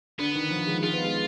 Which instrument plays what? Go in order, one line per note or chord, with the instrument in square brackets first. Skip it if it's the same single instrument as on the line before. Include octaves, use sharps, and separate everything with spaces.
[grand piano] D3 [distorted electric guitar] B3
[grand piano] D#3
F3
G#3
[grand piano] G#3 [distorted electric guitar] F4
[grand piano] B3
G#3